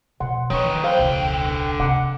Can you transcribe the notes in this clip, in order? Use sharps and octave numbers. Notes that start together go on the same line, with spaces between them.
B2 F#5 C6
D#3 E3 F#3 B4 C#5 C#6
D3 C5 F5 G5
E1 C#2
C3 F#5 A#5 D6